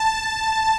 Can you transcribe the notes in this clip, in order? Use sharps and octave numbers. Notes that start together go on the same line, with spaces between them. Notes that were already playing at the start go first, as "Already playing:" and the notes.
Already playing: A5